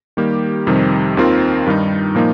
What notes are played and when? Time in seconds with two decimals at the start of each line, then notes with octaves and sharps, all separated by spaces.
0.17 D#3 G3 A#3 G4
0.67 F2 C3 D#3 G3 C4
1.17 D#2 D#3 C4 F4 A#4
1.66 G2 D#3 G3 D#4
2.15 A#2 F3 A#3 D#4